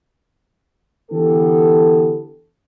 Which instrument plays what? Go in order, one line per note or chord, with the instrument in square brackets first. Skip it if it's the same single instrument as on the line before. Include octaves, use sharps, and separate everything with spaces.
[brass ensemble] D3 E3 B3 G4 A4